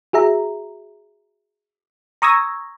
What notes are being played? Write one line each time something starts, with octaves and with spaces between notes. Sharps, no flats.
F#4 G#4 E5 A#5
A#5 C#6 D#6 E6 G#6 A#6